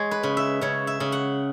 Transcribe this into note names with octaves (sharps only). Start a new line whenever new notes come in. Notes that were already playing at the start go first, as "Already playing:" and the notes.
Already playing: G#3 C#5
B4
C#3
E5
C#3 C#5
E5
C#3
F#5